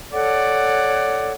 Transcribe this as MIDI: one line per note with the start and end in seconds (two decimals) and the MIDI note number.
0.13 1.33 69
0.13 1.33 73
0.13 1.32 74
0.13 1.33 78